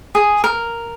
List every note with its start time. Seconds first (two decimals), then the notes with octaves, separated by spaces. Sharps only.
0.15 G#4
0.44 A#4